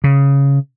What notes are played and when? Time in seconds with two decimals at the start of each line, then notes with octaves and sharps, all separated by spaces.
0.04 C#3